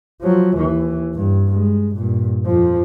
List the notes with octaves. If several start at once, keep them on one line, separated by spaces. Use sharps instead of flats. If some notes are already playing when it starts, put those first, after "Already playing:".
F3 F#3
D#2 E3
G2
G#3
G2 A#2
F2 F3